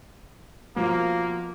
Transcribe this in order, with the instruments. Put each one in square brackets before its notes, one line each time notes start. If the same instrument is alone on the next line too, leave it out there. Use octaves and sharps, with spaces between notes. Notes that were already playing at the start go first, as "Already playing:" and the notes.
[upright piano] B2 F3 [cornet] A#3